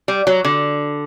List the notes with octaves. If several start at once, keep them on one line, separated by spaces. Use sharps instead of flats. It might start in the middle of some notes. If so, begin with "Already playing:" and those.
G3
F#3
D3